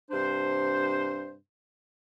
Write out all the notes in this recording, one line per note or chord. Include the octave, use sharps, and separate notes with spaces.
G2 C3 D4 C5